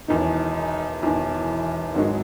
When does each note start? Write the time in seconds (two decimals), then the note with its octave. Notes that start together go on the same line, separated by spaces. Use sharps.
0.08 E1 E2 D#3 D#4
0.18 C#4
0.29 D#4
1.01 E1 E2 D#3 E3
1.94 G#1 G#2 D#3 F#3 G#3